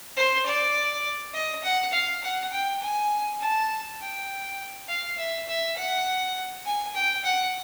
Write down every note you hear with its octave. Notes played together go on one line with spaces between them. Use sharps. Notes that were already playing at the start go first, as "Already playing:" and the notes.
C5
D5
D#5
F#5
F5
F#5
G5
G#5
A5
G5
F5
E5
E5
F#5
G#5
G5
F#5